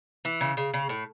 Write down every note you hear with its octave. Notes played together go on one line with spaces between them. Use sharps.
E3
C#3
C#3
C#3
A2